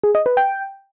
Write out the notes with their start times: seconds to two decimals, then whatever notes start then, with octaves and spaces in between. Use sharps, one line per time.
0.04 G#4
0.15 D#5
0.26 B4
0.37 G5